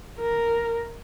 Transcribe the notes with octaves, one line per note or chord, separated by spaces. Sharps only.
A#4